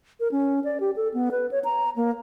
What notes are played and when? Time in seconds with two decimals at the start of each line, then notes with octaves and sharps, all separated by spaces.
0.20 A#4
0.32 C#4
0.64 D5
0.80 G4
0.96 A4
1.14 B3
1.31 B4
1.51 C#5
1.64 A#5
1.96 A#3